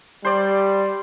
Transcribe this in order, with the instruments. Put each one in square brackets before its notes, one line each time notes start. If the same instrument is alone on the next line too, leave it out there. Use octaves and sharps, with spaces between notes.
[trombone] G3 [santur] C5 D5